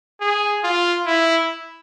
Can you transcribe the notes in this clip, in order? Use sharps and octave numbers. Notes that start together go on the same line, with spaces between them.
G#4
F4
E4